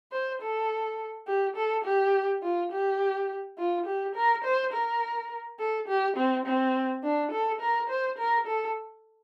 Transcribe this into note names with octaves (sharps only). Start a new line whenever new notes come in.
C5
A4
G4
A4
G4
F4
G4
F4
G4
A#4
C5
A#4
A4
G4
C4
C4
D4
A4
A#4
C5
A#4
A4